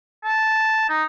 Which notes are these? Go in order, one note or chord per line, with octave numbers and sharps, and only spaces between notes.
A5
D#4